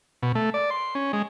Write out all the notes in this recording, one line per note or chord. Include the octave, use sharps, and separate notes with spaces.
B2
A3
D5
C6
C#4
G#3